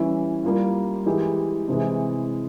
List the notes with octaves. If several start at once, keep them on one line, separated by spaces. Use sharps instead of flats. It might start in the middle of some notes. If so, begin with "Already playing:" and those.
Already playing: E3 G3 C#4 E4
G3 A#3 F4
E3 G#3 E4 G4
C3 E3 G#3